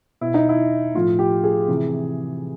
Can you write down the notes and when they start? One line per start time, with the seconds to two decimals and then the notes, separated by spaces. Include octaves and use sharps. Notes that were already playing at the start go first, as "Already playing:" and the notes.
0.21 B2 E4
0.34 D#4
0.49 E4
0.94 A2 F3 F4
1.19 G4
1.44 G#4
1.68 C3 E3